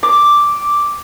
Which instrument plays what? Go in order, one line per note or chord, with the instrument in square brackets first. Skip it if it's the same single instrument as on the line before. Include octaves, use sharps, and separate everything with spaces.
[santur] D6